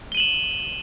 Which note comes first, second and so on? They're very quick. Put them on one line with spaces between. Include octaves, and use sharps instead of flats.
G7 D#7 F#7 E7